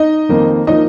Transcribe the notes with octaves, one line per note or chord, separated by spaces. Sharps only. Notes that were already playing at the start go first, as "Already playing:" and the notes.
Already playing: D#4 D#5
F2 D#3 A#3
F3 A#3 D#4 D#5